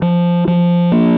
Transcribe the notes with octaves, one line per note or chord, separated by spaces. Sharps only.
F3
F3
A#3